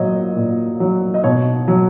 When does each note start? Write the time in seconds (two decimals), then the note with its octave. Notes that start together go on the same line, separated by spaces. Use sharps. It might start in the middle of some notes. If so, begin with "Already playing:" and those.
Already playing: A#2 F#3 C#5 D#5
0.36 A#2
0.80 F#3
1.14 D#5
1.24 B2 C#5
1.68 F#3